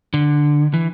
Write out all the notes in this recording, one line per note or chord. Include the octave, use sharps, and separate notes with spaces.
D3
E3